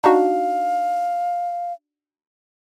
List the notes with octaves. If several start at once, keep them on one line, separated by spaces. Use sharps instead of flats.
D4 D#4 F#4 F5